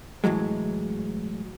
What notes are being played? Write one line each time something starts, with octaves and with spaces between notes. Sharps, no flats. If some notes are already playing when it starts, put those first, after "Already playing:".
A2 E3 F#3 G#3